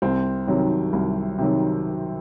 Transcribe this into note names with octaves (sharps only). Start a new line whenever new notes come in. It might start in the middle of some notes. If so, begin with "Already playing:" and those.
C2 C4
C3 D#3 F#3
C2
C3 D#3 F#3